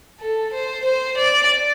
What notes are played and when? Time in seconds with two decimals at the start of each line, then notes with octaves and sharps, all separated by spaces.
0.20 A4
0.53 C5
0.85 C5
1.17 D5